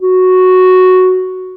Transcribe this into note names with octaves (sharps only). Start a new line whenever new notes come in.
F#4